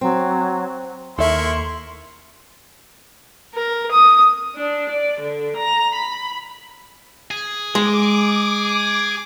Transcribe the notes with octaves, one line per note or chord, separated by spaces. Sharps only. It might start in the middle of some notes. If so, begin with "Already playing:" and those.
F#3 C4
D#2 E4 A4 A#4 E5 C6 C#6
A#4
D#6
D4
D5
D3
A#5
B5
G#4
G#3 D6